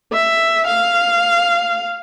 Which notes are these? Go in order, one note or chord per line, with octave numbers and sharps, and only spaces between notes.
E5
F5